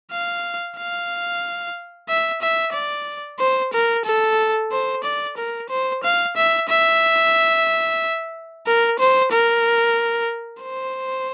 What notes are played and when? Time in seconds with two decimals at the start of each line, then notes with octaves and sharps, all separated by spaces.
0.11 F5
0.77 F5
2.09 E5
2.42 E5
2.74 D5
3.39 C5
3.74 A#4
4.05 A4
4.72 C5
5.04 D5
5.38 A#4
5.70 C5
6.03 F5
6.37 E5
6.69 E5
8.67 A#4
8.99 C5
9.32 A#4
10.63 C5